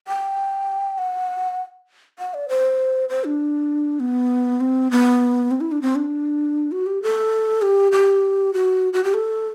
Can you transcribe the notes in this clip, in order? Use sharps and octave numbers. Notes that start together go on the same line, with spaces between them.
G5
F#5
F#5
D5
C5
C5
D4
B3
C4
B3
C4
E4
D4
C4
D4
F#4
G4
A4
G4
G4
F#4
F#4
G4
A4